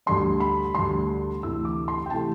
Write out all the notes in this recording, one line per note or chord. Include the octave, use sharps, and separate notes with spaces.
D2 D3 G3 D4 C6
B5
D2 D3 G3 D4 C6
D2 C3 E3 A3 E6
D6
C6
G5
C3 E3 A3 A5